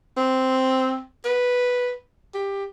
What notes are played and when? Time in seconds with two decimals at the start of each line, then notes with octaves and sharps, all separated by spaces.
0.17 C4
1.25 B4
2.34 G4